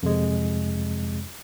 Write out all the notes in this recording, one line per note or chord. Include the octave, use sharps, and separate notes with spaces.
F2 C3 G#3